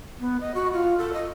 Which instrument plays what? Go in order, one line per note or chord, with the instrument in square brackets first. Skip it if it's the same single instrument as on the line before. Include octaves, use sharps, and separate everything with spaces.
[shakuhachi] B3
D#5
F#4
F4
A4
D#5